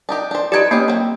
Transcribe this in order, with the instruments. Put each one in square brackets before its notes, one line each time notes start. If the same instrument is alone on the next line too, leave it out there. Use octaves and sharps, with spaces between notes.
[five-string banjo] D4 D#4 G4
D4 C5
[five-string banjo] D#4 B4 D5 [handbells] G4 G#6 D7
[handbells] A#3 [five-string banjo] B3 C#4 G4
[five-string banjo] F#3 C4